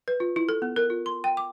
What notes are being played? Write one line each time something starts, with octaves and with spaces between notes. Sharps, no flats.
B4
F4
E4
A4
B3
A#4
F4
C6
G5
D6